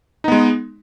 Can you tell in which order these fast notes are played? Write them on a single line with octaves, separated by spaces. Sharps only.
D#4 B3 G#3